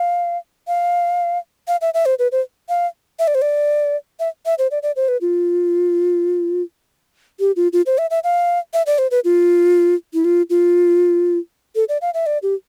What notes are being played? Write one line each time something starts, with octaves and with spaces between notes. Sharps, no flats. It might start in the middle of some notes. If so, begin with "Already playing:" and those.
Already playing: F5
F5
F5
E5
E5
C5
B4
C5
F5
E5
D5
C5
D5
E5
E5
C5
D5
D5
C5
B4
F4
G4
F4
F4
C5
E5
E5
F5
E5
D5
C5
B4
F4
E4
F4
F4
A4
D5
F5
E5
D5
G4